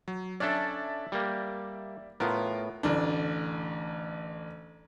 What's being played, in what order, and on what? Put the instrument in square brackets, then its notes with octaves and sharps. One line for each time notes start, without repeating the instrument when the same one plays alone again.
[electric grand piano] F#3
[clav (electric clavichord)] C#4 D4 A4 [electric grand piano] D5 E5
[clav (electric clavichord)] G3 A#3
[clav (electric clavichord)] A2 B3 [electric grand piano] F4 A#4
[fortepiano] A1 D2 D4